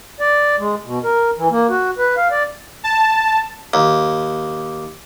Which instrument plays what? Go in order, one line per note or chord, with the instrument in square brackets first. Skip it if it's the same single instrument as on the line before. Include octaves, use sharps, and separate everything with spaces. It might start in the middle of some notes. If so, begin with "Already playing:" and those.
[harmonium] D5
G#3
B2
A#4
E3
A#3
F#4
B4
F5
D5
[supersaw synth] A5
[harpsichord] D#2